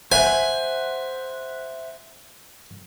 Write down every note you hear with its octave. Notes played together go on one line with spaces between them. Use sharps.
C5 E5 F#5 G#5